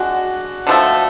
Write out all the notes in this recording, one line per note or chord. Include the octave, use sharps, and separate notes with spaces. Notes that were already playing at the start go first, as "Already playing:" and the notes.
Already playing: G#3 D4 F#4
D3 F3 A3